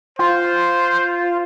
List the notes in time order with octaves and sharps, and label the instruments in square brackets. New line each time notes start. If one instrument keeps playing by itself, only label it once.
[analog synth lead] F4 [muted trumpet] C5